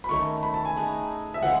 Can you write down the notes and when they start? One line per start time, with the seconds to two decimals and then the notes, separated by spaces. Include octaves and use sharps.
0.04 B5
0.09 D#3 A3 C#4 C#6
0.43 B5
0.54 A5
0.65 G#5
0.76 A3 D#4 G#4 B4
1.34 E5
1.43 C#3 E3 G#3 F#5